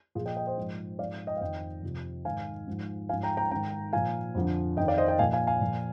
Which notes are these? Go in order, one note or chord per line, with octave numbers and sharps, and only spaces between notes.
A#2 F3 F4 G#4
D#5 G5
D#5 G5
C5 D#5
G#2 F3
G#2 F3 D5 F5
D#5 G5
F5
F2 D#3 D#5 G5
F2 C3 F3
G#2 D#3 F5 G#5
G#2 F3
G#2 F3 F5 G#5
G5 A#5
G5 A#5
G#2 D#3 G5 A#5
A#2 F3 F5 G#5
F2 D3 F3
F2 D#3 D#5 G5
D5 F5
C5 D#5
D#5 G5
A#2 F3 F5 G#5
F5 G#5
F5 G#5
A#2 F3